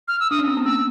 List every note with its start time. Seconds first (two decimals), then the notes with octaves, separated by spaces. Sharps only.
0.08 F6
0.20 E6
0.31 D4 D#6
0.39 C#4
0.48 C4
0.57 B3
0.65 A#3 E6